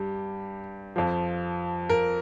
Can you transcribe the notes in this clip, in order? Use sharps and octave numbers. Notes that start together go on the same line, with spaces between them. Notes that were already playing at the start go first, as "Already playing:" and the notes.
Already playing: G2 G4
F2 F3
A#4